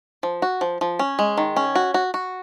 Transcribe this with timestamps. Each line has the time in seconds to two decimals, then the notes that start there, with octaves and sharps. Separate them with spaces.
0.23 F3
0.42 F#4
0.61 F3
0.81 F3
0.99 C#4
1.19 G#3
1.38 D#3
1.56 C#4
1.75 F#4
1.94 F#4
2.14 F#4